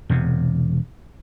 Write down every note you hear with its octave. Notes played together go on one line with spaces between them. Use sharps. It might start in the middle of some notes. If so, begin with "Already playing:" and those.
E1 E2 C3